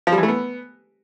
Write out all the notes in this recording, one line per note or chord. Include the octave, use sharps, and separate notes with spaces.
F3
G3
E3
A3
B3